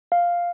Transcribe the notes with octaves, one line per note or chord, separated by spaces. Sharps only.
F5